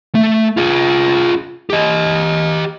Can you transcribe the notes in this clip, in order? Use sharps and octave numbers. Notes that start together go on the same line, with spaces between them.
A3
F4 G#4
G4 D#5